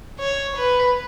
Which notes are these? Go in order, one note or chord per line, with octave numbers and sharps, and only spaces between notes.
C#5
B4